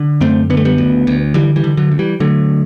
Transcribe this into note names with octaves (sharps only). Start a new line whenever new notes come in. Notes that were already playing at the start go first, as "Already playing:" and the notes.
Already playing: D3
F#2 A3 C4
D3 B3
A3
G3 B3
D2
D2
D3 E3 G3
E3 G3
D3
D3 F#3
D2
E3 G3
D3 F#3 A3